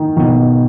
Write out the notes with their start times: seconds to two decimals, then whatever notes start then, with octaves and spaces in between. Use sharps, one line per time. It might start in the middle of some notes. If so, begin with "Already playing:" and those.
Already playing: D#3
0.17 B2 D#3